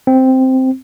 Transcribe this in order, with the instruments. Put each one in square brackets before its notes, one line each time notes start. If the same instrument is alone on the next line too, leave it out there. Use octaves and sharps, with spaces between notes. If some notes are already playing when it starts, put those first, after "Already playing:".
[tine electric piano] C4